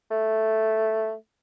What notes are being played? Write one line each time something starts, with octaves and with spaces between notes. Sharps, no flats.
A3